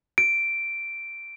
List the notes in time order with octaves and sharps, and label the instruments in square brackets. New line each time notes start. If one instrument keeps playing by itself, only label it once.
[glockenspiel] D7